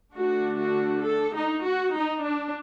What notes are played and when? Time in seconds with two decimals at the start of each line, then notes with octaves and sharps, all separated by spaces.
0.15 D3 A3 D4 F#4
0.60 F#4
1.05 A4
1.34 D#4
1.64 F#4
1.95 D#4
2.24 D4